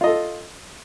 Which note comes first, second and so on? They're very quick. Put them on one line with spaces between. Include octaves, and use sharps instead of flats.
F4 D#5 A4